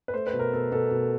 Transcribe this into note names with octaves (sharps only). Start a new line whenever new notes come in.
B4
A3 C5
B4
B2
A#4
B2 A4
B2 A4
B2